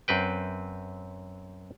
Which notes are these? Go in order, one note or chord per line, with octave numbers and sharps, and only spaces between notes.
F#2 C4 B4 G5